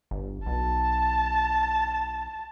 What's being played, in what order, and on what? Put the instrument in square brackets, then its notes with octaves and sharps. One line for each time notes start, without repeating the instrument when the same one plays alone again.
[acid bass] G1
[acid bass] B1 [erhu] A5